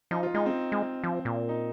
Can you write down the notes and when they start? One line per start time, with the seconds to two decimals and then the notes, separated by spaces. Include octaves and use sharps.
0.11 F3 D#4
0.23 F4
0.34 G#3 D#4
0.46 C4
0.72 G#3
1.04 F3
1.25 A#2
1.49 D#4